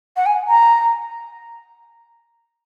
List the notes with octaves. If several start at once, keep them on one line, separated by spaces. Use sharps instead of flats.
F#5
G#5
A#5